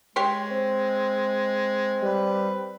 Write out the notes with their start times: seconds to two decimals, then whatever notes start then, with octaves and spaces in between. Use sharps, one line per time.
0.16 G#3 G4 C#5 C6
0.51 C4
2.03 G3 B4